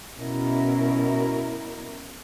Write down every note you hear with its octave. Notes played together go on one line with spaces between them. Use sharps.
B2 C#4 E4 A#4